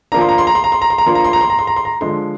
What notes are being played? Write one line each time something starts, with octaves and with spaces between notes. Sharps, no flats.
F3 A#3 D4 A#5
C6
A#5
C6
A#5
C6
A#5
C6
A#5
C6
A#5
F3 A#3 D4 C6
A#5
C6
A#5
C6
A#5
C6
A#5
C6
A#5
D3 F3 G#3 D4 C6